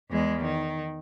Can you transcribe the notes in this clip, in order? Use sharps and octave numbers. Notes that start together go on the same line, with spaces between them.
E2 G#3
D#3